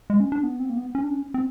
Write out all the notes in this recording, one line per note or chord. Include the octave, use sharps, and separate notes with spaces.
G#3
C#4
D4
B3
C4
A#3
B3
C#4
D4
C#4
C4